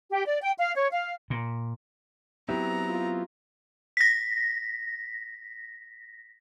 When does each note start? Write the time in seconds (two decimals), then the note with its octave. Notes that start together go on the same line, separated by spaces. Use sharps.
0.10 G4
0.26 D5
0.40 G5
0.57 F5
0.75 C#5
0.91 F5
1.30 A#2
2.49 F#3 B3 C4 E4 G4 A#5
2.89 F4
3.97 A#6 B6